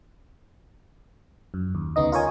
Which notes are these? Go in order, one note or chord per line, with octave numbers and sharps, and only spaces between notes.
F#2
D#2
D2 C#3 B3 D#4 D#5
F4 A#4 C#5 G#5